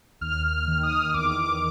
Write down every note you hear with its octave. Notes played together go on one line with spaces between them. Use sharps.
D#2 F6
D#3
D#6
E2 D6
D6